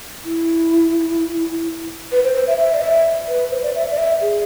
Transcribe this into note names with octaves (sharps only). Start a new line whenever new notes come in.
E4
B4
C5
C5
E5
E5
D5
E5
B4
C5
D5
E5
D5
E5
G#4